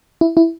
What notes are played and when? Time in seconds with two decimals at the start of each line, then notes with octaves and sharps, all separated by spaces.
0.21 E4
0.37 E4